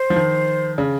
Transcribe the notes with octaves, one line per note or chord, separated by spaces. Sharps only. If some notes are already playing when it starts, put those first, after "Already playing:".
Already playing: C5
F3
D#3
C#3